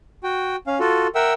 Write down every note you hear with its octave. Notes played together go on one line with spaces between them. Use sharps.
F#4 G5
C#4 F5
F4 F#4 A4
A#4 E5 F#5 G5 E6